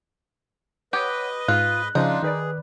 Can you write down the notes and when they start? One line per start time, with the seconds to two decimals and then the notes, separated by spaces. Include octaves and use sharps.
0.93 G4 B4 C#5 D#5 F#5
1.48 G#2 F4 F#6
1.95 C#3 F3 D4 D#4 F4
2.23 D#3 G#4 B4 D5